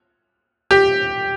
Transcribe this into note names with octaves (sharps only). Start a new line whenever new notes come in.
G4